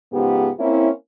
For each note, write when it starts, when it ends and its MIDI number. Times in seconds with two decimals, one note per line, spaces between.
0.13 0.48 44
0.13 0.48 49
0.13 0.48 53
0.13 0.48 59
0.13 0.48 67
0.59 0.89 58
0.59 0.89 60
0.59 0.89 61
0.59 0.89 64